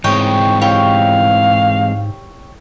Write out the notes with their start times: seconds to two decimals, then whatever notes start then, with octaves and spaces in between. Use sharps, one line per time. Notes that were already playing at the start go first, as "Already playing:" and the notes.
0.04 G#2 E3 G#3 C4 C#5 D#5 G5
0.61 E4 G4 C#5 F5